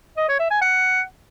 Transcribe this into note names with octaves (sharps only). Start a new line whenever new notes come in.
D#5
C#5
E5
G#5
F#5